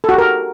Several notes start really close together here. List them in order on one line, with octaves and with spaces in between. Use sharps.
A4 F#4 G4 A#4